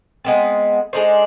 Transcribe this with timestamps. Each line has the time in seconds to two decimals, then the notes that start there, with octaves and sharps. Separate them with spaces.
0.25 G#3 B3 C4
0.93 G#3 D4 D#4 C5